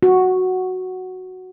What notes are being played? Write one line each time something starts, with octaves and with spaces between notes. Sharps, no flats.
F#4